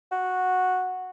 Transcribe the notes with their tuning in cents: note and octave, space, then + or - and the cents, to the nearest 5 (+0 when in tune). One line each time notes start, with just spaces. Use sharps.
F#4 -5